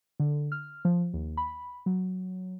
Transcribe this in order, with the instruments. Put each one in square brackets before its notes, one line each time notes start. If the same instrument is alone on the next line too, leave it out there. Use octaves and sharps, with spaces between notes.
[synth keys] D3
F6
F3
D#2
B5
F#3